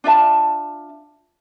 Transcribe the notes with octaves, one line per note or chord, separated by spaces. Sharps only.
D4 F4 E5 A5